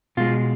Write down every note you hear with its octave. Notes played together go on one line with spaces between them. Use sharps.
B2 G#3 F4